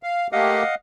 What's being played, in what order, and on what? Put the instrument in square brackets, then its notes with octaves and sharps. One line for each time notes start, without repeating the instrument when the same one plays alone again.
[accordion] F5
[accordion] A3 A#3 G4 [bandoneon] D#5 F5 F#5